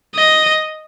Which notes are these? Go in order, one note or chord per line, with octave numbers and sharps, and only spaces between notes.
D#5